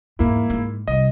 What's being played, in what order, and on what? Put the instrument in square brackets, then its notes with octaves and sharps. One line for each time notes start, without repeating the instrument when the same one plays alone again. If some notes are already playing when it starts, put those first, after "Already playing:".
[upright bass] E2 G#2 [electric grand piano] A#3 E4
[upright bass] G#2
[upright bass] C2 [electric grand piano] D#5